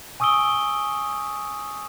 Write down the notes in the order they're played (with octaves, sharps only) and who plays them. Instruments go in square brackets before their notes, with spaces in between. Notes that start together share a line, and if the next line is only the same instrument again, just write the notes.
[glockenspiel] G#5 C#6 D#6 E6 D7 G7